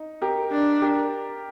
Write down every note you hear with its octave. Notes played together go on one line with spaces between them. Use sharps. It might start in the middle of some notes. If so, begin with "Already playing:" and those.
Already playing: D#4
G4 A#4
D4
G4 A#4